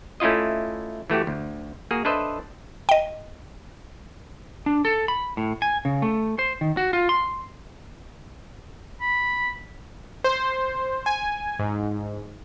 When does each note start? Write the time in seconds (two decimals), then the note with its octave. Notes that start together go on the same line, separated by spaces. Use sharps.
0.20 A3 C#4 E4 F4 D#5
1.10 E3 A3 F#4 G4
1.27 D2
1.91 A#3 F#4 G#4
2.05 D4 A4 B4 C5 D#5 E5
2.89 D#5 G5
4.66 D4
4.85 A4
5.08 B5
5.37 A2
5.62 G#5
5.85 C#3
6.02 A3
6.39 C5
6.61 D#3
6.77 F#4
6.93 F4
7.09 C6
9.01 B5
10.24 C5
11.06 G#5
11.59 G#2